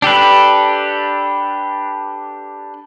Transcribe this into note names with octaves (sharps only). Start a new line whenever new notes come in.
D4 G4 A4 B4